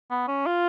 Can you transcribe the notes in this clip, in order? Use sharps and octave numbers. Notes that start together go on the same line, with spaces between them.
B3
C#4
F4